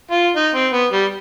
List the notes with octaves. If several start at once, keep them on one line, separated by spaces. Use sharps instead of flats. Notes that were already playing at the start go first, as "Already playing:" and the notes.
F4
D#4
C4
B3
G3